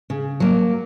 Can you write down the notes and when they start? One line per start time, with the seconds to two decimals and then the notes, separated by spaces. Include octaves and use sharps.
0.10 C#3
0.40 F#3 A#3